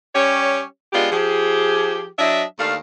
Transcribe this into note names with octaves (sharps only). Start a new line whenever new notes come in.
G3 C#4 G4 C#5
G#3 B3 D4 F4 G4 G#4
F3 G4 G#4
F#3 D4 D#5 E5
D#2 A3 D4 F5